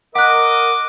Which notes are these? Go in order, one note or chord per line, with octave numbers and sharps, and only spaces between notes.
A#4 D#5 F#5 D6 F#6